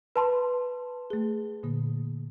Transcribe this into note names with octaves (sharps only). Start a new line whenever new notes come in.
B4 A5 B5 C6
A3 G#4
A#2 D3 A#3